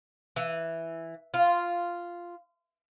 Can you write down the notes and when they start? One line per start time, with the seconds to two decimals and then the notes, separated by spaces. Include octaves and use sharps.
0.36 E3
1.34 F4